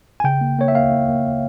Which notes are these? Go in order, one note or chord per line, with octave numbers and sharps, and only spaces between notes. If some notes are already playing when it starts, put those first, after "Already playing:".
G#5
C#3 G5
A#3
A#3 C#5
E5
A#3 F5
A#3
A#3